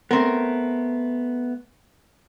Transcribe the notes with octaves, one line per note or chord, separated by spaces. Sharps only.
A3 B3 C4 A#4